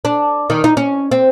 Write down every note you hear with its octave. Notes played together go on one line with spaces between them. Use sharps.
D4
D#3
D#4
C#4
C4